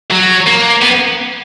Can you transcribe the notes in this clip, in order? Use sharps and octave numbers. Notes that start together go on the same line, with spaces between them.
F#3
A#3
B3